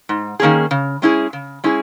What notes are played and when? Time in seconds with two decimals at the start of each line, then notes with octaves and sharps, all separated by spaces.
0.09 G#2
0.40 D#3 A#3 C#4 G#4
0.71 C#3
1.02 G#3 C#4 E4 G#4
1.33 C#3
1.64 G#3 C#4 E4 G#4